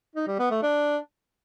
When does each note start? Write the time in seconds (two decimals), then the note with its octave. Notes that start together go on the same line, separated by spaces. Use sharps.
0.16 D#4
0.27 G3
0.39 B3
0.51 A3
0.63 D4